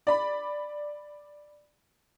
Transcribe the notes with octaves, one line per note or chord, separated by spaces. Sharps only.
D5 B5